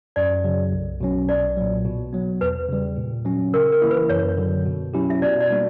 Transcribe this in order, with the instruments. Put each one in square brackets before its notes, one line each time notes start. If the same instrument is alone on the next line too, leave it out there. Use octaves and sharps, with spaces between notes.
[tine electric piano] F#2 [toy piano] D5
[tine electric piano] C#3 F#3
B1
B2 F#3 C#4
[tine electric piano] B1 [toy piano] D5
[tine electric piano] A#2 F#3
B2
F#3 B3
[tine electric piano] E2 [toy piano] B4
[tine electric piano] C#3 G3
A#2
F#3 C#4
[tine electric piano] C#3 [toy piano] A#4
[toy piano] A#4
[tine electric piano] E3 A#3 E4
[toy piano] B4
[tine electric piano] F#2 [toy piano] C#5
[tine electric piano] D3 F#3
B2
F#3 C#4 E4 G4
[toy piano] E5
[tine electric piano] B2 [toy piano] D5
[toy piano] D5
[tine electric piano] G3 A#3 D4 F#4